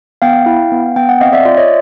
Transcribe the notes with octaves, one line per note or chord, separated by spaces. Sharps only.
B3 F5 G5
E4
B3
B3 G5
F#5
C4 D#5 F5
D5 E5
F4 D5 E5
C#5 D#5